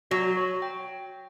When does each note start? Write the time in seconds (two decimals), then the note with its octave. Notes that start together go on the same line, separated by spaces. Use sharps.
0.11 F#3 F#4
0.37 C#5
0.62 G5